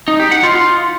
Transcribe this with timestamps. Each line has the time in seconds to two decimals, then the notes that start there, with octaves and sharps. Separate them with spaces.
0.08 D#4
0.20 G4
0.31 F#5
0.43 F4
0.55 F4